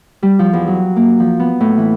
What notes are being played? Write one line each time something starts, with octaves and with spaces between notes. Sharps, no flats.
G3
F3
E2
F#3
A#3
F3
B3
A2
E3